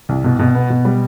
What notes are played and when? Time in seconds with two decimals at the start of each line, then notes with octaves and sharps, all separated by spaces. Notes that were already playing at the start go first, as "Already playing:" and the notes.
0.09 C2
0.24 B2
0.39 B2
0.55 B3
0.70 B2
0.85 G3